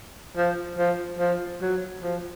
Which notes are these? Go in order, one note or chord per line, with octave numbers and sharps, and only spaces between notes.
F3
F3
F3
F#3
F3